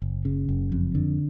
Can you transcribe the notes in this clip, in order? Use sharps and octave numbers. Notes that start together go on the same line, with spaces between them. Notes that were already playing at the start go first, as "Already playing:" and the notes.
F#1
C#3
F#1
F2
D3